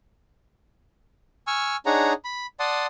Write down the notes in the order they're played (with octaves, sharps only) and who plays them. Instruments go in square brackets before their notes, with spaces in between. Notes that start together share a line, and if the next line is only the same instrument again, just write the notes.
[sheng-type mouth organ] G#5 C#6 E6 F6
D4 D#4 G#4 C#5 F#5 A#5
B5
D5 F#5 A5 C6 D#6